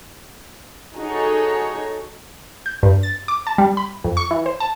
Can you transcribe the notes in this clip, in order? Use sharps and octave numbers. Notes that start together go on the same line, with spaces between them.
D#4 F#4 G#4 A4 C#5
G6
G2
A6
D6
A5
G3
B5
F2
C#6
E3
C5
A5